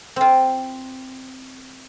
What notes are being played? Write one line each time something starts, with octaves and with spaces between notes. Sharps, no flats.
C4 F4